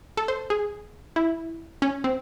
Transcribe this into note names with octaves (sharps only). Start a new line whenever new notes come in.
A4
C5
G#4
E4
C#4
C4